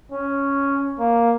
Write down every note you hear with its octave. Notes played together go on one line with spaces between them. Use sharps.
C#4
A#3